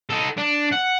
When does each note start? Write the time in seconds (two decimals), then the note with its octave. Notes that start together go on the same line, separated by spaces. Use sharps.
0.10 D#4 A4
0.38 D4
0.72 F#5